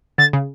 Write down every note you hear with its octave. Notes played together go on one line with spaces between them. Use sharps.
D3 A6
C#3